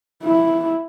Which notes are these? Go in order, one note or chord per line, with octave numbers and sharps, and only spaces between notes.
E4